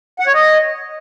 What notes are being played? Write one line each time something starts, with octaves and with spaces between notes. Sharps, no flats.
F#5
C#5
D#5